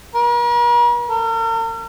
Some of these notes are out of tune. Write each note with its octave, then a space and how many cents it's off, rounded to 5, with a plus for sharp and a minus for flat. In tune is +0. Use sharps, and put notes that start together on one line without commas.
A#4 +45
A#4 -45